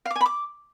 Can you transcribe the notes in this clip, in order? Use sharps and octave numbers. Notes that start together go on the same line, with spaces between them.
F5
D6
G#5
B5
D6